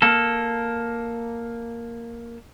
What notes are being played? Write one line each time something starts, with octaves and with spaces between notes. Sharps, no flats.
A#3 A4